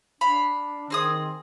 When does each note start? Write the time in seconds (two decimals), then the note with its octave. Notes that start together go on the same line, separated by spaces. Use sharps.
0.21 D4 F5 B5
0.90 D#3 C4 G#4 D#6